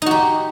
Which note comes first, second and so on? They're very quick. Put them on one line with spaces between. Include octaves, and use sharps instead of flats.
D#4 F#4 G4